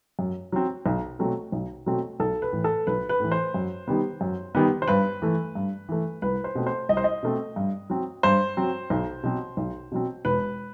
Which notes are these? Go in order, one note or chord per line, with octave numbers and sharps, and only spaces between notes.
F#2
F#3 C4
B1
B2 F#3 A3 C4
B1
B2 F#3 A3 C4
B1 A4
B4
A2 E3
A4
B1 B4
B4
A2 E3
C5
F#2
D#3 G3 B3
F#2
D#3 G3 B3
C5
G2 B4
E3 A3
G2
E3 A3
C2 B4
C5
B2 A3 C4
C5
C2 D#5
C5
D#5
B2 A3 C4
G2
F#3 C4
G2 C5
F#3 C4
B1
B2 F#3 C4
B1
B2 F#3 C4
E1 B4